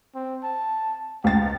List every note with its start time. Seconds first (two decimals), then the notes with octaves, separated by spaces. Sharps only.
0.15 C4
0.44 A5
1.24 C#2 G5 A6